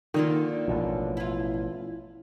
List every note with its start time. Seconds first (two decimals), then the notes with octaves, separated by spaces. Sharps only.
0.14 D3 D#3 A#3 F4
0.68 A1 B2 F3
1.17 E4 F4